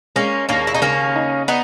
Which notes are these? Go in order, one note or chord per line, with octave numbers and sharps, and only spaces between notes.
G#3 A#3 C#4
D#2 A#3 C#4
E4
D#4
C#3 A#3 C#4
D#4
B3 D#4